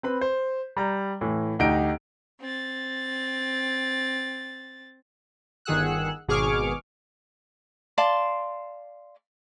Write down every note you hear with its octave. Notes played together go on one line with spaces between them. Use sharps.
C4 B4 B5
C5
G3 A#5 G6
A2 E3
D2 D#4 G4 D7
C4 A6
G1 D#3 G#4 F#5 E6 F#6
G#1 B2 G#4 C#6 D6 F6
D5 F5 A5 C6